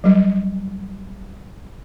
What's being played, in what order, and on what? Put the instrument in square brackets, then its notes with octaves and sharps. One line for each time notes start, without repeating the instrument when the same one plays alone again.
[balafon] F#3 G3